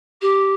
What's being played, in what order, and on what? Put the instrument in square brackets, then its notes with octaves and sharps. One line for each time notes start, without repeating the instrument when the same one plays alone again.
[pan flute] G4